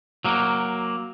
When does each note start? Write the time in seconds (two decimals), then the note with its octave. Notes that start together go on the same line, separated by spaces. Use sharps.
0.25 F#3 A#3